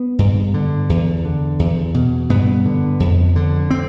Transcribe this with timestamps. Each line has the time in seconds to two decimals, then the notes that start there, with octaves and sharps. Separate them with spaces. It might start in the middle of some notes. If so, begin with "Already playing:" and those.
Already playing: B3
0.19 G2
0.54 D3
0.90 E2
1.25 D3
1.59 E2
1.94 B2
2.30 G2 B3
2.65 D3
3.00 F2
3.36 D3
3.70 C4